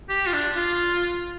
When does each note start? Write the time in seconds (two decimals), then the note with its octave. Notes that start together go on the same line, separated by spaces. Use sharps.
0.09 G4
0.27 F4
0.33 D4
0.56 F4